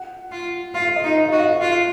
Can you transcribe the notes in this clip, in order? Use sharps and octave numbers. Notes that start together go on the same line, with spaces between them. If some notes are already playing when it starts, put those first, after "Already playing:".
Already playing: F#5
F4
F4 F5
D#5
D#4
D#5
F#4 D#5
F5
F4 F5